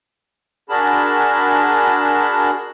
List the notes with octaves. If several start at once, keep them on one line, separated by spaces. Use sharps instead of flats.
D4 F#4 G#4 A#4 A5 B5